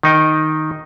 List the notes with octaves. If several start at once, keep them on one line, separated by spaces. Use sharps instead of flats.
D#3 D#4 G5